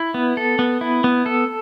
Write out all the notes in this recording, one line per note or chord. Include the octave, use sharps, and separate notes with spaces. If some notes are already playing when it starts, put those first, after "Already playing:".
Already playing: E4
B3
A4
B3
E4
B3
A4